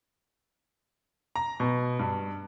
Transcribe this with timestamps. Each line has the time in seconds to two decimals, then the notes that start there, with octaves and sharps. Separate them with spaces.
1.36 A#5
1.60 B2
1.99 G2